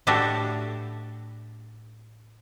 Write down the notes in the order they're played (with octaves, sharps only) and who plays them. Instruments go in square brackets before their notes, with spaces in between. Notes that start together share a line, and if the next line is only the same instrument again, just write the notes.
[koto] A2 A3 D4 F#4 G4 A4